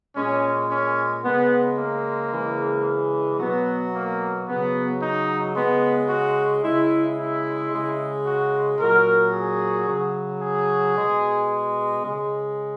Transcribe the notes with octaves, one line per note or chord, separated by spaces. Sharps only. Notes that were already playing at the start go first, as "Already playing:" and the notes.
A#2 G#3 C#4
C#4
C#3 G#3 B3
A#3
C#3 E3 G#3
B2 F#3 B3
A#3
C#3 F#3 B3
D#4
C#3 G#3 B3
F#4
C#3 G#3 E4
E4
C#3 G#3
F#4
A#2 F#3 A#4
G#4
C#3 F#3
G#4
B2 G#3
C#3 G#3